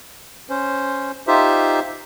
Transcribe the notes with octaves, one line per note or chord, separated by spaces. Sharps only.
C#4 C5
D#4 F4 G4 C5 E5